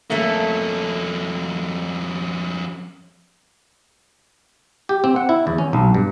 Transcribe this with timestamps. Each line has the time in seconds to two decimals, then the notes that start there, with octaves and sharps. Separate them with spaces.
0.10 F2 A3 A#3 C#4
4.89 G4
5.04 C4
5.16 F#5
5.29 E4
5.47 E2
5.58 C#4
5.73 B1
5.94 G2